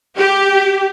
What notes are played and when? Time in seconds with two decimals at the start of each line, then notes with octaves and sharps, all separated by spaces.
0.16 G4